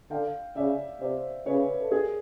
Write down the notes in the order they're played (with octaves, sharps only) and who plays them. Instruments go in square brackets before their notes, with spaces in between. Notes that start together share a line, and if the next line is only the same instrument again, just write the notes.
[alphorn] D3 [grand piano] F5 G5
[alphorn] C#3 [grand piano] D5 E5
[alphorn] C3 [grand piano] C5 D5
[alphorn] C#3 [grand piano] B4 C#5
[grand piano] A4
G#4 A#4